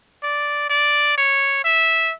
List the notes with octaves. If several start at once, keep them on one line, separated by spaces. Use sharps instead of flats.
D5
D5
C#5
E5